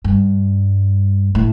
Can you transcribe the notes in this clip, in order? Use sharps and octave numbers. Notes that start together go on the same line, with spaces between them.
G2
A2